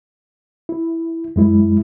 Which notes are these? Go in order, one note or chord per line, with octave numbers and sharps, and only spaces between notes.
E4
F#2 G#3 E4